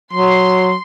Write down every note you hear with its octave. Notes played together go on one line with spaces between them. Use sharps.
F#3 C6